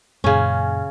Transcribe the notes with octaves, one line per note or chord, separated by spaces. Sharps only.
F#2 A#2 C#3 C#4